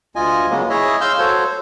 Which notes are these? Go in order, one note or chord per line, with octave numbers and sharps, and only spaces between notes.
D2 F4 D#5 G#5
C#3 F#3 G#3 A#3 B3
E4 G#4 C#5 D#5 E5
F5 C6 E6 F6 G6
F#4 A4 C5 C#5